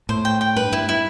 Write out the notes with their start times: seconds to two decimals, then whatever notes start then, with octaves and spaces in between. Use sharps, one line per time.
0.09 A2 C5
0.25 G5
0.41 G5
0.56 G2 B4
0.72 G2 E4
0.89 E4